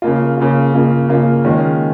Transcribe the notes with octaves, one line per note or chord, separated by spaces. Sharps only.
C#3 A#3 F4
C#3 A#3 F4
C#3 A#3 F4
C#3 A#3 F4
D#3 G#3 C#4 F4